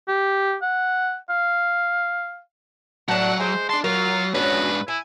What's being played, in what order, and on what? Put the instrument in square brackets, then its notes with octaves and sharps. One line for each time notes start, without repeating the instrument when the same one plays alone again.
[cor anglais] G4
F#5
F5
[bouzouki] A2 D4 [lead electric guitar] F#3 [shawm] F#5
[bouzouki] G#3 [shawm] C5
[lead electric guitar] D4 A5 [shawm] C6
[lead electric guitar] F#3 [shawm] F4 [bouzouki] A#4
[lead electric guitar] G#2 D4 [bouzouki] B3 C#4 F#4 [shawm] B4
[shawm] E4 [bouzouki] G#5